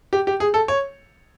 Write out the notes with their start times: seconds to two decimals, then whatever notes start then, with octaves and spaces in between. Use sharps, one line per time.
0.13 G4
0.27 G4
0.40 G#4
0.54 A4
0.68 C#5